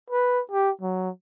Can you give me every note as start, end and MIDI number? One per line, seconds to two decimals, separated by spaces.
0.10 0.41 71
0.51 0.70 67
0.81 1.09 54